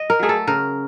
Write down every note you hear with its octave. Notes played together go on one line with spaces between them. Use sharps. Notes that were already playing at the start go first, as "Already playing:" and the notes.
Already playing: D#5
A#4
F#3 A3 G#4
A4
C#3 A#4